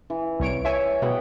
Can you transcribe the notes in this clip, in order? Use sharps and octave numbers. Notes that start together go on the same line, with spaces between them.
E3
C2 C#5 D7
C#5 E5 G#5
B2 B3 F#5 G5